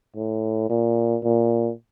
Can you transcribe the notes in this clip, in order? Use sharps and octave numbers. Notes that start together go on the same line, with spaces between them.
A2
A#2
A#2